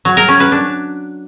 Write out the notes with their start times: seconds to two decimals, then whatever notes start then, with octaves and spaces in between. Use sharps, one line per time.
0.05 F#3
0.17 A#4
0.29 C#4
0.40 B4
0.52 D4